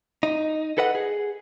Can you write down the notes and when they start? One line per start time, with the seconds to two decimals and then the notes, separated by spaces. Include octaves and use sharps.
0.23 D#4
0.78 A4 B4 D#5 F#5
0.95 G#4